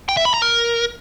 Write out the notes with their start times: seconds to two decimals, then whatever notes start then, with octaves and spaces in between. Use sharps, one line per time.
0.09 G5
0.17 E5
0.25 B5
0.34 A#5
0.42 A#4